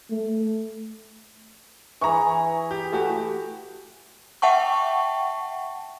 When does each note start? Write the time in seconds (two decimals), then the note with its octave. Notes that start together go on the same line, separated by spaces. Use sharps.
0.11 A3
2.01 E3 G#4 A#5 C#6
2.71 G4
2.92 A3 F#4 G4
4.42 E5 F#5 G5 A5 C#6